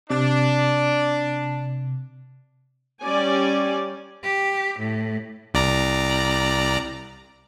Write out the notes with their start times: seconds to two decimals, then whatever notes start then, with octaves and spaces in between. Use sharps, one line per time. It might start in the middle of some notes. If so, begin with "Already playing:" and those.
0.10 C3 D4
3.02 G3 C#4 D5 G#5
4.23 G4
4.79 A2
5.54 C2 D5 A#5